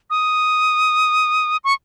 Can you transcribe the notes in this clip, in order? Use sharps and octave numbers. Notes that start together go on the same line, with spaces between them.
D#6
C#6